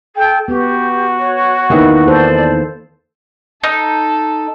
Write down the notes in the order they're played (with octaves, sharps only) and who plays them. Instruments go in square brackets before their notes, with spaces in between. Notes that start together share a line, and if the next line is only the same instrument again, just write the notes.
[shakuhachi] A4 [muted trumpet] G5
[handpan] B3 [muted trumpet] F#4 [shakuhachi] G4
[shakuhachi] C#5
[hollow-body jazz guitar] E2 D#3 E3 [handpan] A#3 D#4 B4
[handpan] A#3 A4 C5 [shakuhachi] D5
[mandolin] D#4 [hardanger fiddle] A4